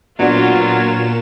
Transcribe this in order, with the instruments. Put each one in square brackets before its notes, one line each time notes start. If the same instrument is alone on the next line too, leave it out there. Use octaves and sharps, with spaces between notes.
[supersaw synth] A#2 E7 [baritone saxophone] F#3 [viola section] A#3 F4 [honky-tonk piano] B3 D4 F#4